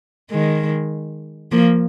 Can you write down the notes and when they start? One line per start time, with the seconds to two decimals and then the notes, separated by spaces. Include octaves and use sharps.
0.31 D#3 G#3
1.52 F3 A#3